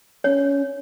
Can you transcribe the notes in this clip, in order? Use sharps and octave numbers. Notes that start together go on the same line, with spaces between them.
C#4 C#5